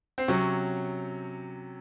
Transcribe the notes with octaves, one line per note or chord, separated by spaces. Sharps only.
C4
C3 F#3 C#4